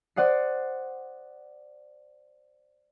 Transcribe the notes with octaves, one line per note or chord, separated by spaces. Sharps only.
C5 D5 F#5 D#6 C7